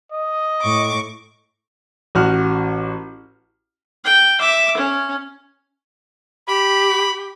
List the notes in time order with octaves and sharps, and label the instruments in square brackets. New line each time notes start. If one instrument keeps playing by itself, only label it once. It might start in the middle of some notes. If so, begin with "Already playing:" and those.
[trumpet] D#5
[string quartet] A2 C#6 D6
[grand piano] A1 F#4 F6
[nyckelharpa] G5
E5 D6
C#4
[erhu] G4 [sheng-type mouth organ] B5